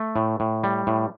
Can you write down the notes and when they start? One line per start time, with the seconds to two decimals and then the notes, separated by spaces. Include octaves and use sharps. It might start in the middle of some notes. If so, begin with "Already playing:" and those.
Already playing: A3
0.16 A2
0.40 A2
0.64 G3
0.87 A2